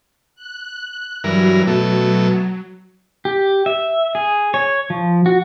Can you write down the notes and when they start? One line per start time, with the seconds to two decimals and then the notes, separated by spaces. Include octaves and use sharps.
0.35 F#6
1.24 G2 E3 F#3 A#4
1.67 B2 A3
3.25 G4
3.66 E5
4.15 G#4
4.54 C#5
4.90 F3
5.26 F#4